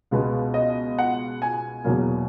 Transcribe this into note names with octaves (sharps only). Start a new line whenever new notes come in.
C#2 B2 G#3 B3
D#5
F#5
G#5
E2 B2 F#3 A#3